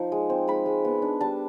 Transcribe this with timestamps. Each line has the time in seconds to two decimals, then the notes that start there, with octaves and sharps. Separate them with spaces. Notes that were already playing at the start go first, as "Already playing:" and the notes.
Already playing: F3 D#4
0.12 G#3
0.30 C4
0.47 G#3 B5
0.66 G#3
0.85 B3
1.02 D4
1.21 G3 A5